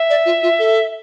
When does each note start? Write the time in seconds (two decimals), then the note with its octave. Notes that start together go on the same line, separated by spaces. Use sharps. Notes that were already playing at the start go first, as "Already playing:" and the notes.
Already playing: E5
0.10 D5
0.26 F4
0.43 F4
0.59 A4